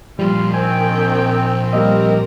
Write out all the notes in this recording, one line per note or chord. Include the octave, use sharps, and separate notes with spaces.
A#2 F3 G3 F4
D#3 C4 G5 G#5
G3 A#3 G4 A#4 D#5